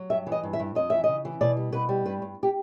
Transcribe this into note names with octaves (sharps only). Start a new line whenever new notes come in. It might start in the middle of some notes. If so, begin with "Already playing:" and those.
Already playing: F#3
G2 E5
E3
D#5
G2
E5
G2
F2 D#5
E3 E5
C#3 D#5
E3
B2 D5
G3
B2 B4
G3
G2 B4
G2
G4